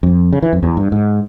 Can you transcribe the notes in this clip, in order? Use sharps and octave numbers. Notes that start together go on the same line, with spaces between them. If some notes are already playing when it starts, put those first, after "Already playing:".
F2
C#3
E3
F2
E2
G2
G#2